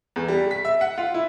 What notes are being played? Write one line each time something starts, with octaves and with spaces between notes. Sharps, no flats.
E2
G3
B6
E5
F#5
F4
E4